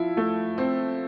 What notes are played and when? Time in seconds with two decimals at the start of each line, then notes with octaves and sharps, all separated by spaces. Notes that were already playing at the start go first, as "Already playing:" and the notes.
Already playing: F3 E4
0.17 A3
0.58 C4